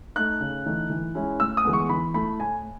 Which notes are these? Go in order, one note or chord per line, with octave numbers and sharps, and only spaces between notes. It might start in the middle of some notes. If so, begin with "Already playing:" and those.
A3 D#4 F#6
C#3
E3 A3 D#4
E3
G#3 C#4 E4
A2 E6
D#6
E3 G#3 B3
C#6
E3 B5
A3 E4 B5
A2 G#5